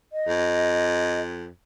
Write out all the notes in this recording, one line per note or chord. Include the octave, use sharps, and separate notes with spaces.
D#5
F2